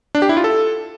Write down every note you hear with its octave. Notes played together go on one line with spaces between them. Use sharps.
D4
G4
E4
F4
A4